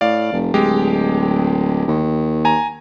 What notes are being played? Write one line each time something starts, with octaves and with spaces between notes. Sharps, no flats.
A2 D5 F5
F1
D1 G#3 G4
D#2
G#5 A#5